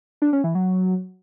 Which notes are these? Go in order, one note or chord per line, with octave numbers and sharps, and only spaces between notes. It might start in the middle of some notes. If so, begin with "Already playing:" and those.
D4
C#4
E3
F#3